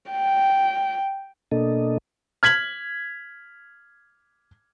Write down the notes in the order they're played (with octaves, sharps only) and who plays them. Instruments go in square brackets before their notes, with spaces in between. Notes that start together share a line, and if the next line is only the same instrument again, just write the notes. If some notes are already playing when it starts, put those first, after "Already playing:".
[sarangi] G5
[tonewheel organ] B2 A#3 D4 A4 D#5
[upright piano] F6 G#6 B6 F#7